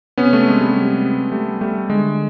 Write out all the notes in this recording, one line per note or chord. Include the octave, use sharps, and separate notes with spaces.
C3 B3 C#4
A3
G#3
G3
G3
G3 A3
G3 A3
D3 G#3